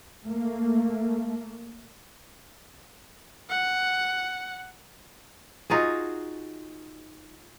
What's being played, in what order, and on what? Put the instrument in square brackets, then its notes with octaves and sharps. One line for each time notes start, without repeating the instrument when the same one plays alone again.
[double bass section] A3 A#3
[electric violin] F#5
[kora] D#4 F4 F#4 G#4